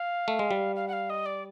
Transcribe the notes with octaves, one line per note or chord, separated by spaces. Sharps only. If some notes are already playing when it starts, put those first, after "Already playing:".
Already playing: F5
A3
G#3
G3
F5
F#5
F5
D#5
D5